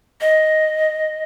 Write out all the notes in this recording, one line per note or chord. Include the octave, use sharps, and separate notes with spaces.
D#5